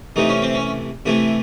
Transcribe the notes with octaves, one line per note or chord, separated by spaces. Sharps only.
C3 E3 A3 D#4
C#4
C4
C#4
C3 E3 A3 E4